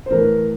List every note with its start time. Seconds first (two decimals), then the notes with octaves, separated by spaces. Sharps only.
0.06 C5
0.10 A2 E3 A#4